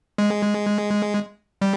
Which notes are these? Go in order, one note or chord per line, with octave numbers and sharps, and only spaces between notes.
G#3
G3